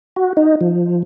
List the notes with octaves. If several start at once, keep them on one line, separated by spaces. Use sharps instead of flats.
F#4
D#4
F3